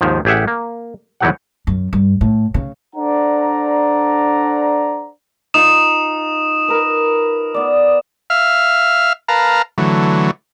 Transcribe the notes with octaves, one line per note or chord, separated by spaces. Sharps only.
D#2 G#2 D#3 F3
A1 G4 G#4 E5 F#5
A#3
E2 D#3 E3 F#3 G4 F#5
F#2
G2
A2
C#3
D4 A4 C5 D5 F#5 A#5
D#4 F4 C6 D#6 E7
A#4 B4
B3 D5
E5 F5 F6
A#4 B4 F5 A5 A#5
D3 E3 F#3 A3